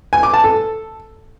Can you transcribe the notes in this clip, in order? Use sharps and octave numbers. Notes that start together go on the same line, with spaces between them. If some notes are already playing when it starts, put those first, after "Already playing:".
G#5
D6
A5
A4